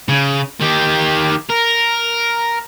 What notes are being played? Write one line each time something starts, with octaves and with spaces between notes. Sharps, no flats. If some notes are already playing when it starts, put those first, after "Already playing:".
C#3
D#3 G4
A#4